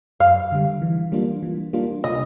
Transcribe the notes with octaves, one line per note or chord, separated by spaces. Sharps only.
F#2 F5
D3 G3
E3
G3 A#3 D4 F4
E3
G3 A#3 D4 F4
C3 D#5